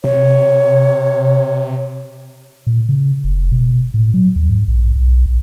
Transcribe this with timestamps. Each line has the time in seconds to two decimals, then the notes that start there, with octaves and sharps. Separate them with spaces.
0.04 C3 C#5
2.67 A#2
2.89 C#3
3.24 F1
3.52 B2
3.94 A2
4.14 F#3
4.36 D#2
4.50 G#2
4.68 A#1
4.96 B1
5.26 A#1